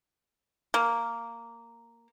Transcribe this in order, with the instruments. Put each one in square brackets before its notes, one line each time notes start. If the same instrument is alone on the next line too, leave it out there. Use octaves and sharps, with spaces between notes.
[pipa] A#3